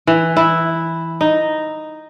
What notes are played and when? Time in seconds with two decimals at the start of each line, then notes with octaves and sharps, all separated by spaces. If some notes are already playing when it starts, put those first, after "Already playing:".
0.07 E3
0.37 E4
1.21 D#4